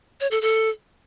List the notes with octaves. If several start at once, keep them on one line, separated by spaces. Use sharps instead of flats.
C#5
A4
A4